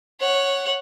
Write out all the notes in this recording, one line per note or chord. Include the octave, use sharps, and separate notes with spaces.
C#5 F#5